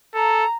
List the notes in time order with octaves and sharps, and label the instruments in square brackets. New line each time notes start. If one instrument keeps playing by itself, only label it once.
[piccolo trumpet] A4 [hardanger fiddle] A#5